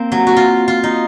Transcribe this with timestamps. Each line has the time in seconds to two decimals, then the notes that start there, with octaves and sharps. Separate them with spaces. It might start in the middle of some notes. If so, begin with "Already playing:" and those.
Already playing: A#3 C4
0.12 F#3
0.27 F#4
0.36 F4
0.68 F4
0.83 D#4